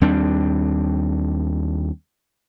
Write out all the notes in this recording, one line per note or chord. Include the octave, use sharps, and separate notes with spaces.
D#2 G3 C4 D4